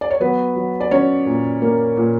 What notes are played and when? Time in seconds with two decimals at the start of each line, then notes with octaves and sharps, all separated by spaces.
0.01 D5
0.10 C#5
0.20 F#3 B3 B4
0.56 F#3
0.80 D5
0.91 F#3 C#4 C#5
1.26 A#2
1.62 A#3
1.97 A#2